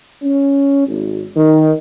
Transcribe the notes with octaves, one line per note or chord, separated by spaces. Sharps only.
C#4
G#1
D#3